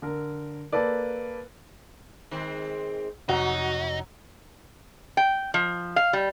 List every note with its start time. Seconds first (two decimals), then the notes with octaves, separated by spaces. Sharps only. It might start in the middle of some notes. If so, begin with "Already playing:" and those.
0.02 D3 A#4
0.73 A#3 A4 B4 D5
2.31 D#3 G#3 C4
3.29 F2 C3 F#3 D#4 F#4
5.17 G5
5.54 F3
5.96 F5
6.13 G3